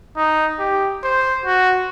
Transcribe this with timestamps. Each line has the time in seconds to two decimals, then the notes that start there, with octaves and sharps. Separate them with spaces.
0.17 D#4
0.60 G4
1.04 C5
1.46 F#4